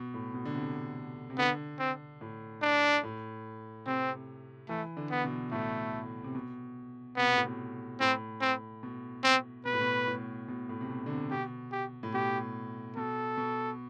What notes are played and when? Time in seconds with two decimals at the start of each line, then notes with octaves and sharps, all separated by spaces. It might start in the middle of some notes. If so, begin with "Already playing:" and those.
Already playing: B2
0.14 A2
0.34 B2
0.45 D3
0.55 C3
1.30 C3
1.38 D3 B3
1.79 C4
2.21 A2
2.62 D4
3.03 A2
3.86 C3 C4
4.69 E3 A3
4.97 D3
5.11 B3
5.24 B2
5.52 A2 A3
6.24 C3
6.35 B2
7.17 C3 B3
7.27 B2
7.36 A2
7.45 B2
8.00 A2 C4
8.41 C4
8.83 B2
9.24 C4
9.65 B2 B4
9.73 A2
9.81 B2
10.07 A2
10.48 B2
10.69 A2
10.81 C3
10.90 B2
11.06 D3
11.10 C3
11.31 B2 G4
11.72 G4
12.03 A2
12.14 B2 G4
12.96 B2 A4
13.37 B2